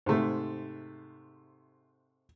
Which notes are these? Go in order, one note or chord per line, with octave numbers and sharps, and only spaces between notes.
G#2 C3 A3